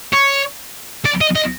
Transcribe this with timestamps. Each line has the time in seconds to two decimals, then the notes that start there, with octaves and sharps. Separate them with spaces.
0.13 C#5
1.05 D5
1.21 D#5
1.36 D#5